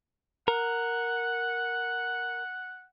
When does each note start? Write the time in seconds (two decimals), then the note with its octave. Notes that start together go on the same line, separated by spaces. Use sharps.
0.48 A#4 F#5